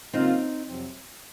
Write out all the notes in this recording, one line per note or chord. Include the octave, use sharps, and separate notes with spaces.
C#3 F#3 A#3 C4 D#4 F4
F2 C3 F#3 C4